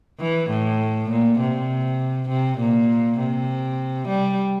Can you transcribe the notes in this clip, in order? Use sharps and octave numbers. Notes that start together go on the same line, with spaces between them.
E3
A2
A#2
C3
C3
A#2
C3
G3